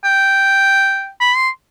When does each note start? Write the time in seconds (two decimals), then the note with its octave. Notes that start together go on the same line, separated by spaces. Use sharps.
0.04 G5
1.21 B5
1.36 C6